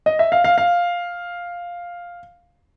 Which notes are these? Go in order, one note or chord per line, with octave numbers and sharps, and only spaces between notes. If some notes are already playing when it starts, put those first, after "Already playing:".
D#5
E5
F5
F5
F5